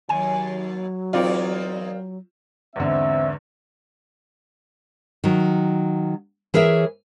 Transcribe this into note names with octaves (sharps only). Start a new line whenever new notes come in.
D#2 F#3 G#5
E2 C4 D#4 F4 A#4 D5
E2 G#2 D3 C4 E5
D#3 F#3
E3 G#4 A#4 C#5 E5